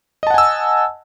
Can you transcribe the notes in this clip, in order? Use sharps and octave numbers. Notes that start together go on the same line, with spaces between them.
D#5 F#5 G#5 A5 E6